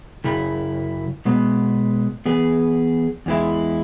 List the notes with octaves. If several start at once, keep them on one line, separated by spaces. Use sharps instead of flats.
F#2 C#3 E4
B2 G#3 B3
E3 B3 G#4 B4
E2 E3 G#3 E4